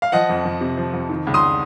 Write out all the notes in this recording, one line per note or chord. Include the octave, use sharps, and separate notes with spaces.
F5
F3 D#5 F#5
F2
F2
C3
F3
F2
D#3
C#2
C6 D#6